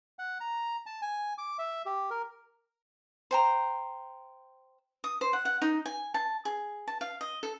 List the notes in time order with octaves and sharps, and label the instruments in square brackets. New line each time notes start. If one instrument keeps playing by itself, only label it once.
[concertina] F#5
A#5
A5
G#5
D6
E5
G4
A#4
[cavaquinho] C5 G5 A#5
D#6
C5
F#5
F#5
D#4
G#5
A5
G#4
A5
F5
D#5
A4